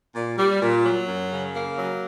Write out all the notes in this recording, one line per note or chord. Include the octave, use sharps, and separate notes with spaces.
A#2
G3
A#2
F#3
F#2
C#3
A#3
F#3